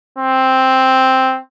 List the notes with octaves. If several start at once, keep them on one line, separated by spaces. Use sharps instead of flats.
C4